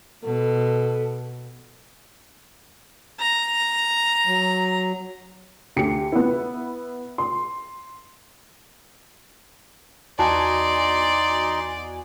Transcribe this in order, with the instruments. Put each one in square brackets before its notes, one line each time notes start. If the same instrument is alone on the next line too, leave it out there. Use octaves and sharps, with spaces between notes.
[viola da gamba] B2 [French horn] A4
[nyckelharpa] A#5
[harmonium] F#3
[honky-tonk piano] D2 G4 C#7
B3 E4
C6
[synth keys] E2 F#4 G#5 [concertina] D#4 C6 [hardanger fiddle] D5 [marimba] A5